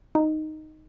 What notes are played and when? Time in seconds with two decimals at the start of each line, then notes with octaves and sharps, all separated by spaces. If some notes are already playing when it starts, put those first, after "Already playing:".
0.15 D#4